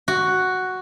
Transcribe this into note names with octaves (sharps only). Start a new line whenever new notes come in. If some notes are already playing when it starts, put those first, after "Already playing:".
F#4